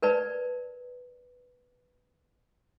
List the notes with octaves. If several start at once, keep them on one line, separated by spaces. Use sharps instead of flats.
A#4 B4 D5 A5